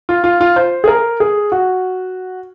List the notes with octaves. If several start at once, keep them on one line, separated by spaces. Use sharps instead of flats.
F4
F4
F4
C5
G#4
A#4
G#4
F#4